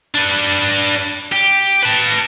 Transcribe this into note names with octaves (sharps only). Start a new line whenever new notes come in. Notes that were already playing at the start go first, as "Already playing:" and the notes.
D4 B4
G4
B4 A5